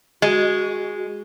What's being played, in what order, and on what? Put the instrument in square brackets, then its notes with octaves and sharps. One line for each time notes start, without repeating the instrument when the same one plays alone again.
[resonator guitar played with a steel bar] G#3 [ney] F#4